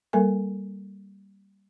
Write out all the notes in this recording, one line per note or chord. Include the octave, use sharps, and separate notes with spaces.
G3 A#3 A4 A#4 G#5